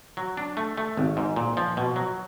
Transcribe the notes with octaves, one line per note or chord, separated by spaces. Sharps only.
F#3
D4
A3
A3
G#1
G#2
A#2
F3
B2
F#3